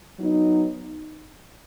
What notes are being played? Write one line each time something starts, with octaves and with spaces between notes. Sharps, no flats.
F#3 B3 D#4